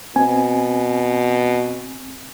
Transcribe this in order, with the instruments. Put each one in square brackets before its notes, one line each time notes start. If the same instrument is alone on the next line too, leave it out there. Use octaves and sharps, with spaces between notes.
[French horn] B2 [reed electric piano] C4 G#5